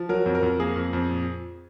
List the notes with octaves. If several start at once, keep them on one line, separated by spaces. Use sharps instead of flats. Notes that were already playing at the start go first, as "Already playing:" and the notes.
Already playing: F3
F#3 A#4
F2
A#4
F2
A#3 G#4
F2
F2
A#2